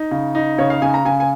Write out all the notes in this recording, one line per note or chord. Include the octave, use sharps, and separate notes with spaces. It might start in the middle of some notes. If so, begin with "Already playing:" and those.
Already playing: D#4
C#3
D#4
C#3 C#5
F5
C#3 G#5
A#5
C#3 G#5
G#5